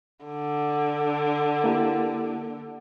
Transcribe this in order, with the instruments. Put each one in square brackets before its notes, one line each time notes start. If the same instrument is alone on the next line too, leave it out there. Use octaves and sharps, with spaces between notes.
[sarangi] D3
[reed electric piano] A#3 E4 G4